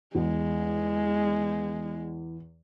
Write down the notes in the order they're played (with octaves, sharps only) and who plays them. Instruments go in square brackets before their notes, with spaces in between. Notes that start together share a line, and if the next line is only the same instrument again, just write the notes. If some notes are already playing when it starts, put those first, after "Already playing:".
[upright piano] E2 [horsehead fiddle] G#3